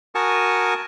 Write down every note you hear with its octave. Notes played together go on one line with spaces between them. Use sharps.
F#4 A#4 G#5 A5 C#6 D#6